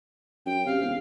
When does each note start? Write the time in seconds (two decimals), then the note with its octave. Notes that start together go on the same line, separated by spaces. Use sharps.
0.46 F#2 G5
0.66 C3 F5
0.81 E1